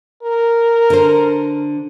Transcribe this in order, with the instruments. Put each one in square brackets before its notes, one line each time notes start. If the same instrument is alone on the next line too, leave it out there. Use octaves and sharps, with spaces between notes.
[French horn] A#4
[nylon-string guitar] D3 C5